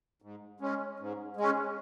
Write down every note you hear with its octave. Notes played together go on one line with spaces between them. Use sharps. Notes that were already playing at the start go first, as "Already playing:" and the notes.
G#2
G#3 C#4
G#2
G#3 C#4